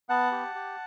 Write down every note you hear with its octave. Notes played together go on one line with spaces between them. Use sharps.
B3 F#5 A5
G4
G4